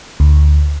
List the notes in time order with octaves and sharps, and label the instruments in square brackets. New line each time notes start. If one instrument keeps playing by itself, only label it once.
[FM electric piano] D2